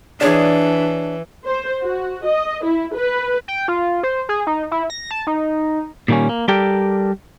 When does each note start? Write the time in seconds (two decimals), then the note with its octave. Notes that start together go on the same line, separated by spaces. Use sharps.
0.21 E3 D4 G#4 C#5 D5
1.46 C5
1.82 F#4
2.25 D#5
2.64 E4
2.95 B4
3.48 G5
3.68 F4
4.03 C5
4.29 G#4
4.47 D#4
4.71 E4
4.90 A#6
5.11 A5
5.27 D#4
6.08 A#2 D#3 G3 A#3 C#4
6.29 A#3
6.48 G3 G4 A4 A#4 D5 G5